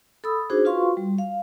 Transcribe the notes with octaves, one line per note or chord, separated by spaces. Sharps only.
A4 B5 D#6 E6
D4 D#4 F#4 G#4 C5
F4 F#4 B4 F5 C6 C#6
G3
F5